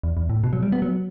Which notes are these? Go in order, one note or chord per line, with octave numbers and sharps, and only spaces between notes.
E2
E2
A2
B2
F#3
G3
B3
F#3